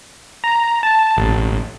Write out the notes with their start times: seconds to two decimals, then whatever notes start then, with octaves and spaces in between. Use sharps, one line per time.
0.44 A#5
0.83 A5
1.17 A1